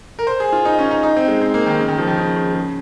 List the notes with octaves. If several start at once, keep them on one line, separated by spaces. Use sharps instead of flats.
A#4
C5
G#4
F4
D#4
C#4
D#4
D#4
C4
G#3
C4
A#3
D#3
C#3
D#3
F3
D#3
C#3
C#3
C#3